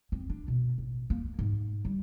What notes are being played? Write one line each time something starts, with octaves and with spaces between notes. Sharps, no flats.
C4
D4
B2
A1
A#3
G#2
G3